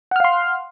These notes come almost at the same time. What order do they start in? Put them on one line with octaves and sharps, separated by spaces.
F#5 F6 F5 C6